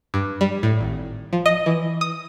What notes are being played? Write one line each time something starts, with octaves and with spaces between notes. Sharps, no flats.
G2
G3
A2
G#1
F3
D#5
E3
D#6